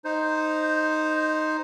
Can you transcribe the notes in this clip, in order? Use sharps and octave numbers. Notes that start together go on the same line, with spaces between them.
D#4 C5